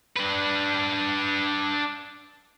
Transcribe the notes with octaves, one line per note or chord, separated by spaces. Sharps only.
D4 B4